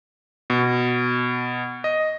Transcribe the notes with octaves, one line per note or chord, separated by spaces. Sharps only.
B2
D#5